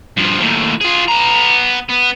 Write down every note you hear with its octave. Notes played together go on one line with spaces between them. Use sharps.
G2 F3
D#2 A2
F4 G#4
B3 A#5
B3